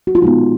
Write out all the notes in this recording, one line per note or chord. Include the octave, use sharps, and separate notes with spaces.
F#4
F4
A#2 G#3 B3 D#4